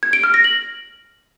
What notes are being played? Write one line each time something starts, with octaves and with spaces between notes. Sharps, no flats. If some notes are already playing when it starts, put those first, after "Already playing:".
G#6
D7
F6
A#6
F#7